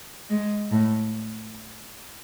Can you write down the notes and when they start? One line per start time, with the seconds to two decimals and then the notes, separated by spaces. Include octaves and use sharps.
0.30 G#3
0.72 A2